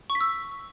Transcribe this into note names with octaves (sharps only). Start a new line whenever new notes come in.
C#6
B6
E6